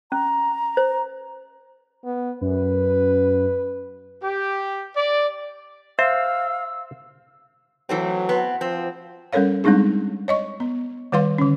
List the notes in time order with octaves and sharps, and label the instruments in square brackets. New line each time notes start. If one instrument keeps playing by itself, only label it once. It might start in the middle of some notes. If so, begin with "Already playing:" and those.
[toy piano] C#4 [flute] A#5
[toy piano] C5
[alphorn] B3
[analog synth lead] F#2 [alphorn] B4
[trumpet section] G4
D5
[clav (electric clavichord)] C5 [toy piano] E5 [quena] F5 [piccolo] E6
[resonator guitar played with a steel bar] E3 A3 C4 [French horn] F#3
[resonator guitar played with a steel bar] B3 C4
[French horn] F3 [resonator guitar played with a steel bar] C4
[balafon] G3 C#4 A4 A#4 C#5 F5
G3 G#3 C4 D4 D#4 G#4
C#5 D#5 C#6
B3
D#3 G3 B4 F5 C6
D3 C#4